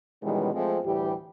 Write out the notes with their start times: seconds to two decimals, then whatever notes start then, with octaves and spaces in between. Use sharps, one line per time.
0.22 B2 D#3 E3 G3 G#3 C#4
0.53 F3 G#3 A3 C4
0.84 D2 A2 E3 G3 G4